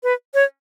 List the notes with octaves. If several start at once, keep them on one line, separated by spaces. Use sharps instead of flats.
B4
C#5